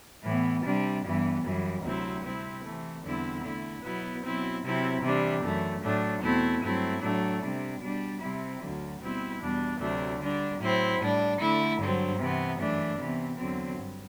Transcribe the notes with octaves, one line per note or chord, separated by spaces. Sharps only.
A2 E3 B3
C3 G3 D4
G2 E3 B3
F#2 E3 G3
D2 C3 F#3 C4 E4
C3 G3 C4 E4
C3 E3 A3
E2 D3 G3 C4 E4
D3 A3 E4
B2 F#3 B3 E4
B2 F#3 C4 E4
C3 F#3 C4 E4
C3 E3 G3 D4
F#2 E3 A3
A2 F#3 A3 D4
E2 B2 A3 C4 E4
G2 F#3 A3 C4 E4
A2 F#3 A3 D4
C3 G3 D4
B2 G3 D4
C3 G3 C4 E4
D2 D3 F#3
B2 G3 C4 E4
E2 B2 G3 D4
D2 C3 F#3 A3 D4
D3 G3 D4
A2 F#3 C4 E4
A2 G3 D4
D3 A3 E4
G2 D3 F#3 C4
C3 E3 B3
F#2 E3 A3 D4
C3 E3 B3
E2 D3 F#3 C4
G2